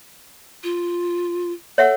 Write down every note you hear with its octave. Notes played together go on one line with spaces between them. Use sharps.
F4
A4 C#5 E5 F#5